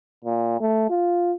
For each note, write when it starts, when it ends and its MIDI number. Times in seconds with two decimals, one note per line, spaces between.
0.24 0.59 46
0.60 0.88 57
0.90 1.34 65